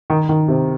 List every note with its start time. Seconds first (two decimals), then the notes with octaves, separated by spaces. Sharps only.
0.10 D#3
0.29 D#3
0.48 C3